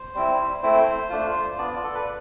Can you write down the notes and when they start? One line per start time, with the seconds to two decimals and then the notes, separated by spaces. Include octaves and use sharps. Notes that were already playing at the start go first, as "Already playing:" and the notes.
Already playing: C5
0.14 G3 C4 E4
0.63 A3 C4 E4 C5
1.10 A3 D4 F4
1.58 B3 D4 F4 D5
1.84 A4
1.94 B4